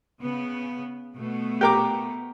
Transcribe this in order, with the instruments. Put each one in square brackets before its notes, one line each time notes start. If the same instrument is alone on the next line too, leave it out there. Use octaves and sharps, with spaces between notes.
[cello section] C#3 B3
B2 A3 B3
[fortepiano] G4 A#4 D6